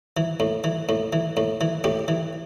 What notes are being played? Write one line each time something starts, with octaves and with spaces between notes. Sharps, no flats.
E3
A2
E3
A2
E3
A2
E3
A2 G4
E3